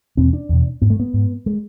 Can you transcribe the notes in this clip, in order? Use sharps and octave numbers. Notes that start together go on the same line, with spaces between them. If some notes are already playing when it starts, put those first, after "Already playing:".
E2 B2 C4
D4
E2 B2
G#2 B3
A3
B3
G#2
G#3